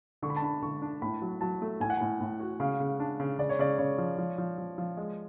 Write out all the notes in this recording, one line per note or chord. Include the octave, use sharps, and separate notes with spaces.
D3 C#6
B5
A5
D4 B5
D3 C#6
D4
A2 B5
F#3
F#3 A5
A3
A2 G#5
F#5
A2 G#5
A2
F#4
C#3 F5
C#3
D4
C#3
C#3 D5
C#5
C#3 D5
C#3 C#5
F3
F3
F3
F3
F3
G#3